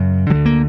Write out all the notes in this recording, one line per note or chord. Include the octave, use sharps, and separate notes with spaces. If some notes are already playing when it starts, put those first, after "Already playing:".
Already playing: F#2 C#3 F#3
D2 D3 F#3
A#3